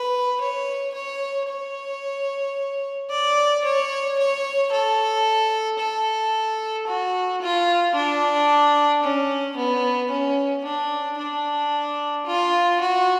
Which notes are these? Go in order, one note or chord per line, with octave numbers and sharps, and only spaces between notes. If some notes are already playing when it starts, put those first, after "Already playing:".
Already playing: B4
C#5
C#5
C#5
D5
C#5
C#5
A4
A4
F#4
F4
D4
C#4
B3
C#4
D4
D4
F4
F#4